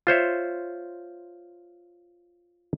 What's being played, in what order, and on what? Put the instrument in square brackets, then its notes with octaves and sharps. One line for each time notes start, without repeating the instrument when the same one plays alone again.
[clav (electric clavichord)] F4 C5 C#5 E5